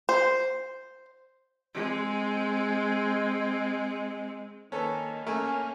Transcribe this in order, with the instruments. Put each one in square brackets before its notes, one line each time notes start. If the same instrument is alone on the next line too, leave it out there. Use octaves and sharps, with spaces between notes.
[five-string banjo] C5
[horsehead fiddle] G#3 C4
[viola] D#3 A#3 [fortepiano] C#4 A4 B4
[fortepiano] A3 [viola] A#3 C#4 [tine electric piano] A#4 G#5